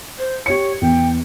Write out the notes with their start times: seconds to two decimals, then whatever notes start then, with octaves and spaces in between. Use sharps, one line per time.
0.19 C5
0.46 G4 C#5 C#7
0.81 E2 G5